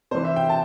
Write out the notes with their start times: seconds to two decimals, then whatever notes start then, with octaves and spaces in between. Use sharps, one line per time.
0.11 C3 E3 C5
0.24 E5
0.36 G5
0.49 A5